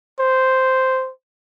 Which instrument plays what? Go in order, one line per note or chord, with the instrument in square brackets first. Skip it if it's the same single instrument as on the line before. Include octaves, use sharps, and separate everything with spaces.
[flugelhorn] C5